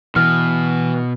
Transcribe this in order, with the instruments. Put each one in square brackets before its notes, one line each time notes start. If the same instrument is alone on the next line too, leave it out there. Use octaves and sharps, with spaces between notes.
[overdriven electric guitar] B2 [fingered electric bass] E3 [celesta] F6